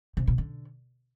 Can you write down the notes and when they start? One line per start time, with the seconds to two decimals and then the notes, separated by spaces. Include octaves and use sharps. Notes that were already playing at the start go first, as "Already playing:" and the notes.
0.17 C3
0.27 B2
0.38 D3